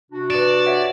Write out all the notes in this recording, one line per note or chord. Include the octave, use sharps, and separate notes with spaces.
C3 D4 F#4
B4 D5 D7 E7
C#5 E5 F#5